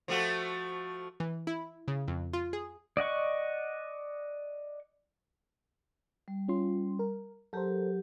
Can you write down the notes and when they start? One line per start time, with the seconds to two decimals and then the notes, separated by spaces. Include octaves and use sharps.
0.08 F3 A3 F#4
1.20 E3
1.47 E4
1.88 C#3
2.08 F2
2.33 F4
2.53 G#4
2.97 D5 D#5 F#5 C#6
6.28 G3
6.48 C#4 F4 C6
6.99 A#4
7.53 F#3 G4 A4 A#4 C5